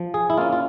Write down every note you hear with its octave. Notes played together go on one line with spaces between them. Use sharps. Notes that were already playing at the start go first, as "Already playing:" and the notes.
Already playing: F3
G#4
E4
A#3 C#4 F4
F4